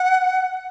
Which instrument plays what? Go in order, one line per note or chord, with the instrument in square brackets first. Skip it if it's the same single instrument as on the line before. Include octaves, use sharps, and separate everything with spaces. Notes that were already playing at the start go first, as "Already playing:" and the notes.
Already playing: [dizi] F#5